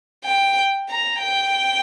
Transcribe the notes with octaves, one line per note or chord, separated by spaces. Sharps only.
G5
A#5
G5